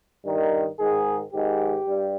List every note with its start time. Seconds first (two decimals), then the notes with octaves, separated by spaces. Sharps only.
0.24 G2 D#3
0.78 G#2 D#3 G#4
1.32 G#2 D#3 G4
1.87 G2